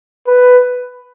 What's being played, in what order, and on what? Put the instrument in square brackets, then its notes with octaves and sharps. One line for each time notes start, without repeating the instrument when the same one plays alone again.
[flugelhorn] B4